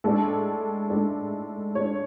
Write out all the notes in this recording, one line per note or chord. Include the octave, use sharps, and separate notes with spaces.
A2 G#3 D4 A4
A2 G#3 D4
A2 G#3 D4 C#5